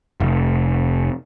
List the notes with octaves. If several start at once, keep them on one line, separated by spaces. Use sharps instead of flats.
F1